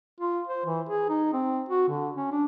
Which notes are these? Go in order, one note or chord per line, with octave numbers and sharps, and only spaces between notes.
F4
C5
E3
G#4
D#4
C4
F#4
D3
C#4
D4